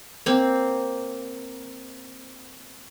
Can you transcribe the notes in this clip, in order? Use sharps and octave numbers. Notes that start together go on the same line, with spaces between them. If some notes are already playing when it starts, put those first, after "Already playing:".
A#3 C4